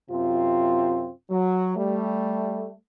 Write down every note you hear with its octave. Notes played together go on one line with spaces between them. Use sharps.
F#2 C3 C4 F4
F#3
G3 A3